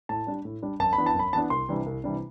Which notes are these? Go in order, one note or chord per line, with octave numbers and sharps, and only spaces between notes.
A2 A5
G3 D4
A2
G3 D4
F#2 A5
B5
E3 B3 D4
A5
F#2 B5
E3 B3 D4 A5
C2 C6
C3 E3 G3 D4
C2
C3 E3 G3 D4